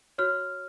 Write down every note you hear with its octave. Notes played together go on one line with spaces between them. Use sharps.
F#4 C#5 F6